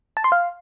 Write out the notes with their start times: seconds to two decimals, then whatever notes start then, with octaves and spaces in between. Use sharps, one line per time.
0.17 A5
0.24 C6
0.32 F5